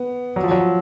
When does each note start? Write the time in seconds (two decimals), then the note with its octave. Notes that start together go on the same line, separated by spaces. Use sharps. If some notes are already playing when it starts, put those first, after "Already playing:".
Already playing: B3
0.36 F#3
0.43 F3
0.51 F#3